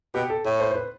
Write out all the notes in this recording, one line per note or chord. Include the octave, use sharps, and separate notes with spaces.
B2 G4
A4
A2 A4
C5
C5
B4